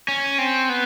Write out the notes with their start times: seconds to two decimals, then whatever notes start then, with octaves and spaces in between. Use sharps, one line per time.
0.08 C#4
0.38 C4
0.69 B3